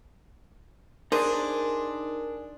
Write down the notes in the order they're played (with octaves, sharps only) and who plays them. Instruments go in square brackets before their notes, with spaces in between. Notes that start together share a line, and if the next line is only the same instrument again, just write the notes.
[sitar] D4 [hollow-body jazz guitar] D#4 C5 [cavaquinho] G#4 [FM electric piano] A#4